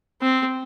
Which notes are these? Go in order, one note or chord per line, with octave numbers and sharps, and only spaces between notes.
C4